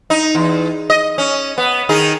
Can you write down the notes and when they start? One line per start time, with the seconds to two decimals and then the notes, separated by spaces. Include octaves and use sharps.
0.10 D#4
0.35 E2
0.90 D#5
1.18 C#4
1.58 B3
1.89 D#3 D#4 G#4